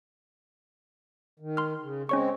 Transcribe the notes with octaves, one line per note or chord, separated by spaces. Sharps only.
D#3
C6 F6
C#3
G#3 C4 C#4 C#5 C#6